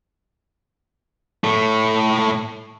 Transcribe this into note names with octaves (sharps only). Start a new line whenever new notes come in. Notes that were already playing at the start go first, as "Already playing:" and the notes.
A2 A3